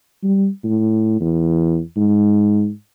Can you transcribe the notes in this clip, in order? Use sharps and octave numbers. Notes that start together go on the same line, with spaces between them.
G3
A2
E2
G#2